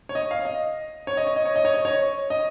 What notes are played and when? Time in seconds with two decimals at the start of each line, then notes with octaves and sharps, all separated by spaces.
0.09 C#5
0.15 D#5
0.31 F5
0.45 D#5
1.07 C#5
1.17 D#5
1.27 C#5
1.36 D#5
1.45 C#5
1.56 D#5
1.65 C#5
1.74 D#5
1.85 C#5
2.30 D#5